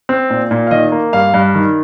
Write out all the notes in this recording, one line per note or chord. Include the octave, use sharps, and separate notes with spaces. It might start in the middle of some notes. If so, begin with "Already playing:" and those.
C4
A#2
A#2
F5
D#3 D#5
A#3
G2 F5
G2
D#3